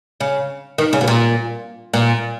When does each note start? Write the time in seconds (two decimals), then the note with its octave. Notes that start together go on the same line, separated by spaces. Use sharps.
0.20 C#3
0.78 D#3
0.93 C#3
1.01 B2
1.07 A#2
1.94 A#2